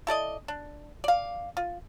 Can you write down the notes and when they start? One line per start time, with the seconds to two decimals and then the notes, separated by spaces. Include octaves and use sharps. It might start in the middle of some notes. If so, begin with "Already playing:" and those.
0.07 E4 A4 D5 D#5
0.48 D4
1.04 D5 F5
1.57 F4